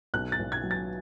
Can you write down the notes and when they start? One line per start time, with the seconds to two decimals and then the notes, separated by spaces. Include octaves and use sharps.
0.14 B1 F#6
0.32 A6
0.39 B1
0.52 G#6
0.63 F#3
0.71 A6